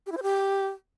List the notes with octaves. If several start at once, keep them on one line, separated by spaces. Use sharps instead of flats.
G4
E4
C5
G4